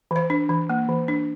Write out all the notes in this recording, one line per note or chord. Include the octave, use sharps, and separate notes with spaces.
E3 C5
D4
E3
A#3
E3
D4